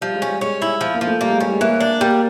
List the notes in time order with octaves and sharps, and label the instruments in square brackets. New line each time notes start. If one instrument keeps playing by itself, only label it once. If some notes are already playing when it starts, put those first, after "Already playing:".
[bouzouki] F3 [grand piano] G3
[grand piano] G#3
[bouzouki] C#4
[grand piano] G3
[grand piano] G#3 [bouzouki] C#4
[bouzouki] E4
F3
[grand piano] A#3
[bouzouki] F3
[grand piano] A3
[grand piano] G3 [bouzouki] A#3
[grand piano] G#3
[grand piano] G3 [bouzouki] C#4
[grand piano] G#3
[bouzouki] E3 [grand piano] A#3
[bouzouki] D4
[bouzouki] G3 [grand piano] A#3